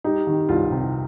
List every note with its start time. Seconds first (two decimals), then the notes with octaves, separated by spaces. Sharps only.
0.04 G3 D#4
0.27 D#3
0.49 C2 F4
0.71 C3